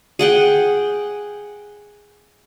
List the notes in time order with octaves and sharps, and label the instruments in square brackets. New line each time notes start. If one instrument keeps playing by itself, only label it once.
[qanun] G#4 F#5 G5